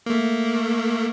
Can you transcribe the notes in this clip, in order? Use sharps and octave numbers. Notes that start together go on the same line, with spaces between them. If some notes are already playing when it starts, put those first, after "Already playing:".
A3 A#3